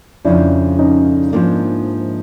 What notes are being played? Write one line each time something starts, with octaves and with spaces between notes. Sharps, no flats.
F2 C#3 F3 D4 E4
C#4 D#4
G#2 F3 A#3 D4